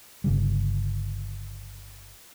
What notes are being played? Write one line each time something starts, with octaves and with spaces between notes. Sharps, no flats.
G1 C#3 G3